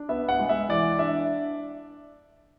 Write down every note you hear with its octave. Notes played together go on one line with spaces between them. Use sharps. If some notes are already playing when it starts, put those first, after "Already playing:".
Already playing: D4
B3 E5
F#5
G#3
E5
E3 D5
D4 E5